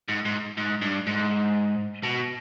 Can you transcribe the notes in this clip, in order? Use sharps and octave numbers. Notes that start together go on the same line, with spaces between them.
G#2
G#2
G#2
G2
G#2
B2